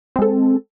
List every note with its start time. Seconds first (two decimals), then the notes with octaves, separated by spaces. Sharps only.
0.16 C4
0.19 G#3
0.22 A4